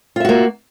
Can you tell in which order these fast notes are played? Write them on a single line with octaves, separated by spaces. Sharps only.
F4 E5 F#4 A#3